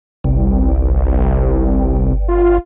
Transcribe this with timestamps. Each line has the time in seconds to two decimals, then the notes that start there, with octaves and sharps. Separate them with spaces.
0.24 G1 C2
2.28 F4